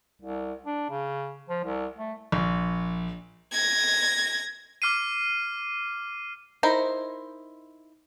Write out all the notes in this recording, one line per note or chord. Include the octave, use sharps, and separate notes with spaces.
C2
D4
C#3
F3
C2
A3
A#1
G#6 A#6
D6 F6 C7 D#7
D#4 E4 A#4 C5